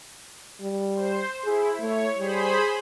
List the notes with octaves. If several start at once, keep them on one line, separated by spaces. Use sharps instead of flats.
G3
C5
E4 G#4
A3 C#5
G3 G#4 C5 B5